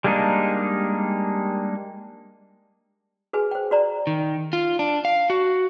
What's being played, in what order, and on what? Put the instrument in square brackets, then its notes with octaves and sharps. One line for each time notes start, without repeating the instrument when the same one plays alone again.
[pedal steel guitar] G3 G#3 A#3 D4 D#4
[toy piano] F#4 G#4 B4 G#5
C5 G5
F#4 D5 A#5
[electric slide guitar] D#3
F4
D4
F5
F#4